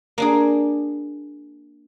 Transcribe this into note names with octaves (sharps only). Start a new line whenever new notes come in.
A#3 D4 G#4